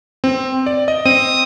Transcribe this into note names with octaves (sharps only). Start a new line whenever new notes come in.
C4
D5
D#5
C4 D#6